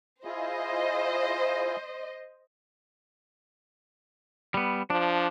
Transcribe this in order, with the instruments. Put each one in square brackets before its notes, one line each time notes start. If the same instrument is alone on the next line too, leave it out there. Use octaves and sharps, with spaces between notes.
[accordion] E4 F4 G#4 [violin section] C5 D#5
[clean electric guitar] G3 B3
[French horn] F3 [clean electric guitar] D4